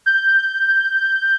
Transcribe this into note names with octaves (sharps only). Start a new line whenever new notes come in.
G6